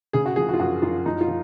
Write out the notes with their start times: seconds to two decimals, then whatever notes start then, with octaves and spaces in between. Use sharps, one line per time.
0.13 C#3 G#4
0.26 F#4
0.36 F3 G#4
0.49 F#4
0.54 F4
0.60 F#2 F#4
0.82 F#2 F4
1.06 F3 D#4
1.21 F4
1.28 F3